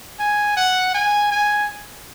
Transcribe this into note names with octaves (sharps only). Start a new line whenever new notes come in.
G#5
F#5
G#5
G#5